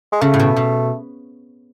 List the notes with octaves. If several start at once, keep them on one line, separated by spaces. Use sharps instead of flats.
G#3
C#3 A3
A2
B2
B2